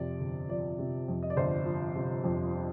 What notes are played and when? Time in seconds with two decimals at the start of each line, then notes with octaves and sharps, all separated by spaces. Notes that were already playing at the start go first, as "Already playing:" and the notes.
Already playing: F2 C3 D5
0.21 G1
0.49 F3 D5
0.79 C3
1.08 F2
1.22 D#5
1.30 D5
1.37 G1 C5
1.66 F3
1.96 C3
2.24 F2